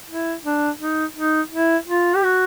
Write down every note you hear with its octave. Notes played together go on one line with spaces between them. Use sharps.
E4
D4
D#4
D#4
E4
F4
G4
F#4